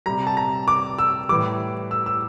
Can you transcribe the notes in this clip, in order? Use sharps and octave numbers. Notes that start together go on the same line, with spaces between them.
C3 G3 A#5
A5
A#5
D6
E6
A2 E3 G3 D6
E6
E6